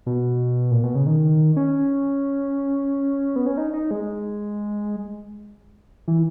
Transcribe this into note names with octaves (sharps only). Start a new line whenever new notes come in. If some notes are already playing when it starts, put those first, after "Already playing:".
B2
A#2
B2
C#3
D#3
C#4
B3
C#4
D#4
D#4
G#3
E3